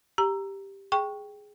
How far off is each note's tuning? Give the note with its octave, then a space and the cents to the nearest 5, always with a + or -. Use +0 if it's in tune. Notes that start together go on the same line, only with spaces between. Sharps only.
G4 +0 A#5 +0
G#4 +0 G5 +0 C#6 +0